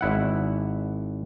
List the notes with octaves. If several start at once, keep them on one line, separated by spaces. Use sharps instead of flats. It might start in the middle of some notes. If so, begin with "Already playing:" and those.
G#1 E4 F#5